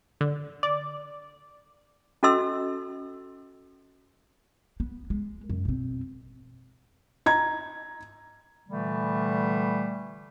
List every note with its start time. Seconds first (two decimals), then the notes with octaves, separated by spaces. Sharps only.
0.21 D3
0.63 D5
2.23 C#4 F#4 A4 D#5 C6 E6
4.80 B3
5.10 G#3
5.49 F#2
5.65 B2 C4
7.26 A#5 G#6
8.68 A#2 D3 E3 G3 A3